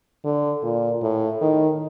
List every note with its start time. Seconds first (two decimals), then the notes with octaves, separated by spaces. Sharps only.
0.24 D3
0.63 A#2
1.03 A2
1.41 D#3